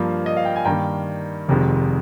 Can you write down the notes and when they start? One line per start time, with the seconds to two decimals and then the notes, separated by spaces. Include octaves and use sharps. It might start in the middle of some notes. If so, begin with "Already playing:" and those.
Already playing: G2 F3 A#3
0.26 D#5
0.37 F5
0.45 G5
0.56 G#5
0.65 G2 D#3 A#3 G5 A#5
1.48 F1 F2 C3 D#3 G#3